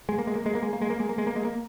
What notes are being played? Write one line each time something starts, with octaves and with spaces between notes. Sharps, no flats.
G#3
A#3
G#3
A#3
G#3
A#3
G#3
A#3
G#3
A#3
G#3
A#3
G#3
A#3
G#3
A#3